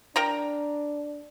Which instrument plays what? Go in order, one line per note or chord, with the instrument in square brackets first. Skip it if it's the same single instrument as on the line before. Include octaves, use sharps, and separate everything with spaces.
[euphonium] D4 [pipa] A#4 G5 A#5